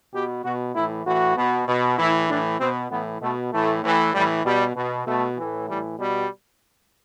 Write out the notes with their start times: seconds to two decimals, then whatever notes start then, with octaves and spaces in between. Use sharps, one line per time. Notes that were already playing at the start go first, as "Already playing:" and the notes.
0.14 B2 G4
0.44 B2 F#4
0.75 A2 E3 E4
1.06 A2 E3 F#4
1.37 B2
1.68 B2
1.99 A2 E3 E4
2.29 A2 E3 D4
2.60 B2 C4
2.91 A2 E3 B3
3.22 B2 A3
3.52 A2 E3 A3
3.83 A2 E3
4.14 A2 E3 G3
4.45 B2 G3
4.76 B2
5.07 B2 A3
5.37 A2 E3
5.68 A2 E3 G3
5.99 B2 G3